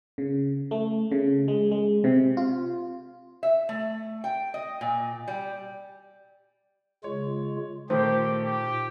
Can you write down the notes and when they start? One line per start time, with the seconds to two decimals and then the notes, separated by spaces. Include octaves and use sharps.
0.18 C#3
0.71 A3
1.11 C#3
1.48 G#3
1.72 G#3
2.04 C3
2.37 F4
3.43 E5
3.69 A3
4.24 G5
4.54 D#5
4.81 A#2
5.28 G3
7.04 C#3 G#3 F4 C#5
7.90 A#2 D#3 A3 G4 C5
8.44 G4